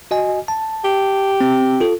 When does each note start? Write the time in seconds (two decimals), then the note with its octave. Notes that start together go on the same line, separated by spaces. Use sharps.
0.11 F#4 D#5 G#5
0.48 A5
0.85 G4
1.41 C4
1.80 F4 A4